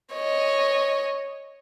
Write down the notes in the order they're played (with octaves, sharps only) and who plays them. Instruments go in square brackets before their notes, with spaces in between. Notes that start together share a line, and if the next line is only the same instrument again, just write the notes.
[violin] C#5 D#5